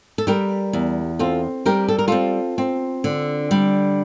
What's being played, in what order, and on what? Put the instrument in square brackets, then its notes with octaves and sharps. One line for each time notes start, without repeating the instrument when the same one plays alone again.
[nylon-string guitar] A4
G3 G4 A#4
E2
C4 F4 A4
G3 G4 A#4
A4
A#4
C4 F4 A4
C4
D3
G3